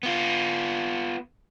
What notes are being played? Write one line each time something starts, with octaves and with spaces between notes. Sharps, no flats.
B3 F4